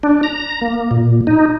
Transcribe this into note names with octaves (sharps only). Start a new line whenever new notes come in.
D4
A#5
A#3
A#2
D#4